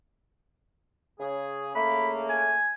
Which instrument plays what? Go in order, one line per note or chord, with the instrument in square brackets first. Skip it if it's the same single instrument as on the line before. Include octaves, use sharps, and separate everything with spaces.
[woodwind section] C#3 G#4
[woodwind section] C#3 A3 A#3 [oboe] B5
[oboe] G#5